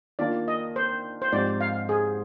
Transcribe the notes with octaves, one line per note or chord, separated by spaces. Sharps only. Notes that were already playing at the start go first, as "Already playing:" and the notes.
D#3 A#3 D4 F4 D5
D#5
C5
C5
G#2 F3 C4 G4 C5 D5
F5
G#4